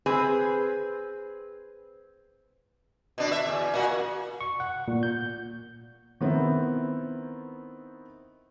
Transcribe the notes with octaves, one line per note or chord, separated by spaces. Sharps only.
C4 G#4 B4
B2 D4
E5
E2
A#2 F#4
C#6
F#5
A#2
G6
D#3 B3 C4 E4